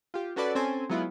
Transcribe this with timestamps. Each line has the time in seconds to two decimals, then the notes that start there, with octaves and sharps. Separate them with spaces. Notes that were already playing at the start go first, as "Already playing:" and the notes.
0.14 F4 G4
0.36 C#4 F#4 A4 B4 D5
0.55 C4 C#4 A4 C5 G#5
0.90 F#3 G#3 B3 E4 F4